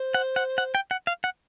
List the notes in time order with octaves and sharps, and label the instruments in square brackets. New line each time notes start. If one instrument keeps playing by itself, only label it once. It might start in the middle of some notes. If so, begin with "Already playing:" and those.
Already playing: [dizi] C5
[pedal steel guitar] F#5
F#5
F#5
G5
F#5
F5
F#5